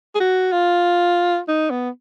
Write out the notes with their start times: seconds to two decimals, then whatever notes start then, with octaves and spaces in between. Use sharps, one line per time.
0.15 G#4
0.20 F#4
0.52 F4
1.48 D#4
1.70 B3